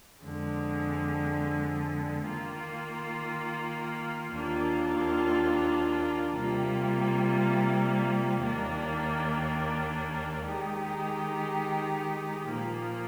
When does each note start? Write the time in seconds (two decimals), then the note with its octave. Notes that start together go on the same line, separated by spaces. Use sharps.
0.23 F2 D3 G#3
2.27 D#3 A#3 F4
4.32 D#2 D#3 A#3 D4 F4
6.36 C3 G3 A#3 F4
8.42 D#2 D#3 A#3 D4
10.46 D#3 G#3 D#4 G4
12.51 A#2 F3 A#3